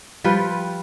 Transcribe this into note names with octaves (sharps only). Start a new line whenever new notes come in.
F3 G3 F4 B4